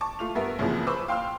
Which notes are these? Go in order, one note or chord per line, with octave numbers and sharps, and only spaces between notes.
A5 C#6 D6
A3 F4 F7
G2 B3 A#4 E5
C2 F#2 C#3 E3 F3 A#3
B4 C5 B5 C#6 D6 E6
F5 G5 C6 E6 F6